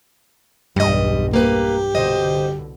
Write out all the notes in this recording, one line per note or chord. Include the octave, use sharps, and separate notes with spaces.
B1 E2 G2 G3 D#5
A#3 G4 B4
C2 B2 D3 C5 D#5